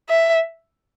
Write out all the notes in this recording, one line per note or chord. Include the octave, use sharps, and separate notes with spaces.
E5